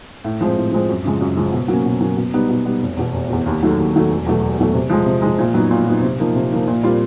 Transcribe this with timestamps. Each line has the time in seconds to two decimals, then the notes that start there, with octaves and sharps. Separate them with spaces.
0.24 A2
0.41 F3 G#3 C4
0.56 A2
0.72 F3 G#3 C4
0.89 F#2
1.05 C#3 F3 G#3
1.21 F#2
1.37 C#3 F3 G#3
1.52 B2
1.68 F#3 A#3 C#4
1.85 B2
2.01 F#3 A#3 C#4
2.17 B2
2.34 G3 B3 D#4
2.49 B2
2.65 G3 B3 D#4
2.81 F1
2.97 E2 B2
3.14 F1
3.29 E2 B2
3.46 D#2
3.62 D#3 F#3 A3
3.77 D#2
3.93 D#3 F#3 A3
4.10 E1
4.26 E2 B2 F#3 A3
4.42 E1
4.58 E2 B2 F#3 A3
4.74 C3
4.90 F3 G#3
5.06 C3
5.22 F3 G#3
5.38 A#2
5.54 F#3 B3 D#4
5.71 A#2
5.86 F#3 B3 D#4
6.02 C3
6.19 F3 A#3 D#4
6.35 C3
6.51 F3 A#3 D#4
6.67 A#2
6.83 G3 C4 F4 A#4